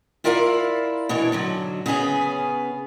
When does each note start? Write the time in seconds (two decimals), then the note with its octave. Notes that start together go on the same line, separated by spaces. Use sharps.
0.24 E4 F4 A#4 D5 E5 F5
1.09 B2 E3 D4 C#5
1.32 G#2 D3 F#3
1.86 C#3 B3 C#4 G#4